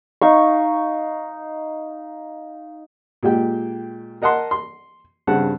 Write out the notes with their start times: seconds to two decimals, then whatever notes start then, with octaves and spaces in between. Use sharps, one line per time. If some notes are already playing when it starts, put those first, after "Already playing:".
0.21 D#4 F5 C#6
3.23 A#2 G#3 G4 G5
4.22 A#4 D#5 F#5 A5 C6
4.51 C6
5.27 G2 C#3 C4 F#5 A5 F#6